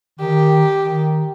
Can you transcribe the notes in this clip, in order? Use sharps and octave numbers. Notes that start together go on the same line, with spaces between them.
D#3 G4
D#3